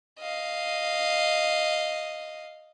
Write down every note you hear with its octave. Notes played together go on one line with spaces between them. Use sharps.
D#5 F5